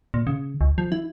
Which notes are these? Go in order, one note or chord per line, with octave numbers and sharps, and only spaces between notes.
A#2
C#3
C#2
F3
E4